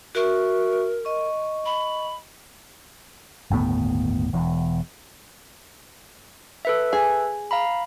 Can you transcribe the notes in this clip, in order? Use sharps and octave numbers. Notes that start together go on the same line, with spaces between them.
F#4 A#4 E5 C#6
D#5 C#6
B5
G1 D#2 A2 B3
E1 E2
A4 B4 E5
G#4
F5 A#5 B5